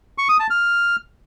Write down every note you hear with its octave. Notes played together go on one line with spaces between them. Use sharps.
C#6
D#6
A5
F6